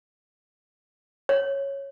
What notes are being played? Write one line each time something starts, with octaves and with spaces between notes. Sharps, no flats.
C#5